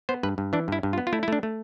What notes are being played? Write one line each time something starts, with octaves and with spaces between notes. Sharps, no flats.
B3 C5
G2 B4
G2
E3 D4
G2 E4
G2
F4
B3
F4
A3 E4
E4
A3 D4
A3